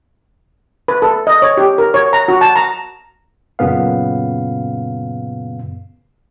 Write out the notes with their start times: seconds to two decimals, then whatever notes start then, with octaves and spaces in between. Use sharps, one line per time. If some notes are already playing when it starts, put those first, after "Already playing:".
0.88 B4
1.02 A4
1.27 D#5
1.42 C#5
1.58 G4
1.78 A#4
1.94 C#5
2.13 A#5
2.28 F#4
2.41 A5
2.56 A#5
3.59 F#2 A#2 C#3 B3 F5